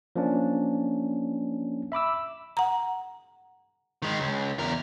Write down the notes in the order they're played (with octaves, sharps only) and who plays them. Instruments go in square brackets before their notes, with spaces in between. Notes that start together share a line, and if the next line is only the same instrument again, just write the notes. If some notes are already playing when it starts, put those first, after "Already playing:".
[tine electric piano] F3 A#3 C#4 D4
E5 B5 D6 E6
[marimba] F#5 A#5
[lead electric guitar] D#3 G#3
C#2
E2 A#4